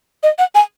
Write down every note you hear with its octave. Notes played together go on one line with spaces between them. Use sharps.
D#5
F#5
G#5